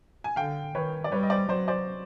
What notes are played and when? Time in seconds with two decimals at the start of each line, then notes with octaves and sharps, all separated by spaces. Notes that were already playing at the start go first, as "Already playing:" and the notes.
0.24 G#5
0.36 D3 F5 G5
0.75 D#3 B4 C#5
1.04 D5
1.12 G3 B4 C#5
1.23 D#5
1.30 C5 D5
1.49 F#3 C5 D5
1.68 C5 D5